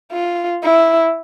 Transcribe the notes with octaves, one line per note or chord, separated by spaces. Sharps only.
F4
E4